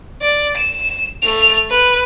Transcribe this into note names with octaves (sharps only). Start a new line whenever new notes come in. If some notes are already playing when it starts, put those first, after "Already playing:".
D5
E7
A3 F7
B4